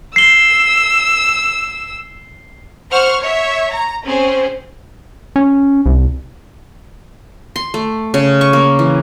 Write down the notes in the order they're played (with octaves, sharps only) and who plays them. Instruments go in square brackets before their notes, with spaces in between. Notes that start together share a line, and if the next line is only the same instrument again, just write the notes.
[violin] E6 [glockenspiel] C7 G7
[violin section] C5 F#5 C#6 F6
C#5 E5
A#5
C4 C#4 G#4 C5
[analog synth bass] C#4
C2
[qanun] C6
A3
C#3
C#6
A#3
E3